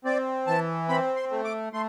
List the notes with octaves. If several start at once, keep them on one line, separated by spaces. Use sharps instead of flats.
C4 D5
E3 A5
C4 B5
C6
A3
D6
A3 C6